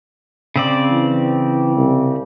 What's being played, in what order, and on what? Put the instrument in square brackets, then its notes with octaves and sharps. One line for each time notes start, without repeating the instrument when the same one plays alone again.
[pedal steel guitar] C#3 C4 D5
[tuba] E3
C2